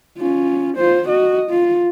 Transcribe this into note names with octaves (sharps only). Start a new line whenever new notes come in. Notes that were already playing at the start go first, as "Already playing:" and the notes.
C#4 F4
F4 C5
F#4 D#5
F4